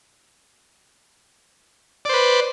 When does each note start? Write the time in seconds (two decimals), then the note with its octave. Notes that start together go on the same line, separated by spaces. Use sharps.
2.05 D5
2.09 C5
2.13 B4